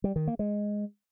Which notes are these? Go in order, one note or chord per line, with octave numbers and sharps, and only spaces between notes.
G3
D#3
A#3
G#3